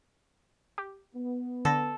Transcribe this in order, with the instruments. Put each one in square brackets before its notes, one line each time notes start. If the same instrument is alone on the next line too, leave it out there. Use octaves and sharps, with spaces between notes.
[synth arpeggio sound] G4
[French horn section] B3
[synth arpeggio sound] D3 A#6 [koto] A4